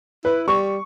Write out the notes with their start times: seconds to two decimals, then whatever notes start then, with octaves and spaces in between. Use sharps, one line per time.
0.25 E4 B4
0.48 G3 C#6